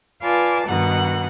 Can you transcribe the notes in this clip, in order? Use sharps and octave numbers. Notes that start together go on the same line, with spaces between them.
F4 B4 D5 F5 G#5 A5
G2 B2 D#3 D#4 F#5